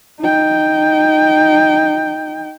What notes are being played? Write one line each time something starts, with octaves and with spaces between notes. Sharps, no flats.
D#4 G5